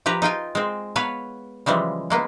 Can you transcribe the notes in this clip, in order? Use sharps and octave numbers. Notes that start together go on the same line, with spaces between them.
F3 G4 B4 A#5
D#4 F4 G5 G#5
G#3 C4
B3 B4 C#5 F5
C#3 E3 F3 G3 G#3
G#3 A#3 B3